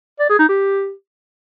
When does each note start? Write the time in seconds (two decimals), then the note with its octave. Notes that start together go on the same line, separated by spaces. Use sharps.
0.20 D5
0.29 G#4
0.39 D#4
0.49 G4